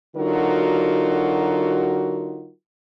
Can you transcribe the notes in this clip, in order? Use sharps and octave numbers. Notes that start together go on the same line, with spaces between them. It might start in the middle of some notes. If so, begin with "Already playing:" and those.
D3 F#3 D#4 F4 F#4 A#4